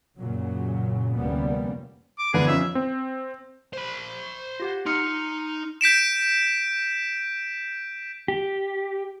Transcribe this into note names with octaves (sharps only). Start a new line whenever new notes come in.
F#2 A#2 C#3 F#3
F1 D2 G3 A#3 B3 C#4
D6
E2 D3 G#4 B4
F2 C#4 E5
C4
C5 B5
F4 G4 F#5
D#4 C6 F6 C#7
G6 B6 D7 E7
G4